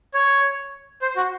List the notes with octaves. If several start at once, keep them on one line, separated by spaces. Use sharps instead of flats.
C#5
C5
F#4